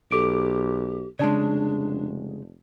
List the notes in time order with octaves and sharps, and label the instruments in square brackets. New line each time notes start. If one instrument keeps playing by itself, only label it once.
[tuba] B1 [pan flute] G4 [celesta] A4 D6 D7
[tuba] F1 [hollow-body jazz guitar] C#3 G#3 [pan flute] D4 [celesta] D5 A5